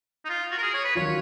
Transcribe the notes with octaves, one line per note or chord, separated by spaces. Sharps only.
D#4
F4
F#4
A#4
G#4
C#5
B4
D#3 F#3 C#4 F4 C#5